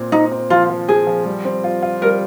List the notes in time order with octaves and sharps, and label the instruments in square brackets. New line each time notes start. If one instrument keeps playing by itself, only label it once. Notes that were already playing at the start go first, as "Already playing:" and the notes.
Already playing: [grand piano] A#2 C4
[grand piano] C4 [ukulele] D#4
[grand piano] C4
[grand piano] F3 [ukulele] F4
[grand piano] F3
[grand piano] C4 [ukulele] G#4
[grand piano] F3
G3
C4
F4
F4
[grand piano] G3 [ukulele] A#4